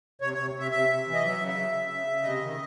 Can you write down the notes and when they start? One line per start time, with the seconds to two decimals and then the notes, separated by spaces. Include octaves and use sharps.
0.21 C3 C#5
0.33 C3 C#5
0.54 C3
0.59 E5
0.71 C3 E5
0.89 C3
1.06 E3
1.14 D#5
1.22 F#3 E5
1.40 C#3
1.48 E5
1.56 C#3
1.73 C#3
1.91 C#3
2.07 C#3
2.23 C3 D#5
2.41 D#3